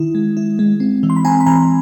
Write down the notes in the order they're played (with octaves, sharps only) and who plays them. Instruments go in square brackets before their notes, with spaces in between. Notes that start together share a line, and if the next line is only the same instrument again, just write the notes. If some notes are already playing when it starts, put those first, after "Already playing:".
Already playing: [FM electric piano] D#3 E4
G#3
E4
G#3
C4
E3
C6
B5
C4 G#5 A#5
B5
E3 G#5 A#5